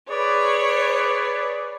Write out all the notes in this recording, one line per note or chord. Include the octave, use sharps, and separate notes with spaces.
G#4 B4 C#5 D5